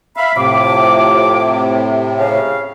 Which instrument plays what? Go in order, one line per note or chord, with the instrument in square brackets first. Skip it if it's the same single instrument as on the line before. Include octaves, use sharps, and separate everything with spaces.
[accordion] E5 F5 [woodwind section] B5
[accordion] A2 C3 [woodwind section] F3 D6
[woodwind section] C#3 F5